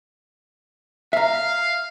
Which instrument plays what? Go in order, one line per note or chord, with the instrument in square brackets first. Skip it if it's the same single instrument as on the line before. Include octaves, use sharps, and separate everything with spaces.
[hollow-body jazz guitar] E5 A#5 [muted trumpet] F5